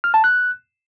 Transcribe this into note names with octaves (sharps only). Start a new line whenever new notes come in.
F6
A5
F#6